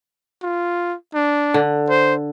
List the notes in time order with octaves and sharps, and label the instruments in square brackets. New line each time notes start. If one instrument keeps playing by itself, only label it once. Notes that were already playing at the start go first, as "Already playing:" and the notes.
[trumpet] F4
D4
[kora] D3
[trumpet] C5